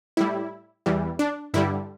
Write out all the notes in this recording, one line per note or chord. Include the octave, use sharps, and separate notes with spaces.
A2 G3 E4
E2 E3 G3
D4
G2 D3 G3 E4